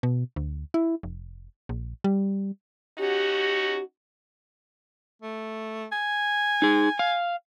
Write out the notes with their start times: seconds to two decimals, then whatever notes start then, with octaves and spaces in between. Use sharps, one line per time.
0.03 B2
0.36 D2
0.74 E4
1.03 F1
1.69 A#1
2.04 G3
2.99 C#4 D#4 F#4 G4
5.22 A3
5.92 G#5
6.62 D#4 G#4
6.99 F5